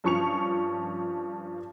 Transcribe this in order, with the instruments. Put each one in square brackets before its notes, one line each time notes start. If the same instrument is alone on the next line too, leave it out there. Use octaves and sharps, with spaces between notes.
[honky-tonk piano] G2 F3 C#4 C#6 C#7 F7